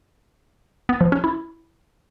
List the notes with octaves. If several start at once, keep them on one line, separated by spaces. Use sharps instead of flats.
B3
F3
C#4
E4